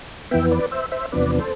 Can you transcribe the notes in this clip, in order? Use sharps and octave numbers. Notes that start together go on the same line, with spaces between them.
F2 E3 B3 E5 G5
B4 D5
C5 E5
C5 E5
E2 C3 F3 B3 D4 B4 D5
A4 C5